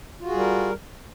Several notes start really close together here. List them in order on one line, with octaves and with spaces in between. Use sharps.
F4 F#4 G#4 G3 A#4